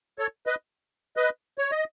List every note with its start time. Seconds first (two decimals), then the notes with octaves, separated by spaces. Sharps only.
0.19 A4 C#5
0.47 B4 D#5
1.17 B4 D#5
1.58 C#5
1.72 D#5